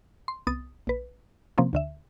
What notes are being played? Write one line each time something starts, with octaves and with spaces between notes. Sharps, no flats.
C6
C2 B3 D#6 A6
A#1 B4
C3 F3 A#3 C4 C#4
D2 D3 E5